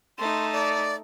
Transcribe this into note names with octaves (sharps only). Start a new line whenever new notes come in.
A3 D#4 C6
D5